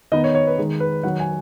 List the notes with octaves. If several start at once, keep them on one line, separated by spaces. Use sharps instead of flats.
D#3 B3 D#4 D#5
C#5
C#5
B4
D#3 G#3 D#4
B4
D#3 F#3 D#4 F#5
G#5